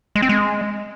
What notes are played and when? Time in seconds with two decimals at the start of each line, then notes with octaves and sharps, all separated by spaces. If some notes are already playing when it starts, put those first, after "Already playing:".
0.16 G#3
0.22 C4
0.29 G#3